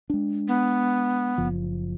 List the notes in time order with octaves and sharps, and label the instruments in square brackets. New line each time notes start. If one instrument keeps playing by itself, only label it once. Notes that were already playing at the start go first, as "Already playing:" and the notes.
[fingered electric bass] G#3 D4
[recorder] B3
[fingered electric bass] F#1 F3